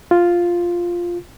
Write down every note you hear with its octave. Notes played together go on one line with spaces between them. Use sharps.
F4